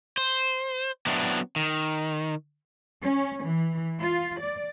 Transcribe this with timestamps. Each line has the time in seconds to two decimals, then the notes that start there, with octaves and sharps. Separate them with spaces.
0.17 C5
1.07 F#3 B3 C4 D4 E4
1.56 D#3
3.02 C#4
3.43 E3
3.99 F4
4.40 D5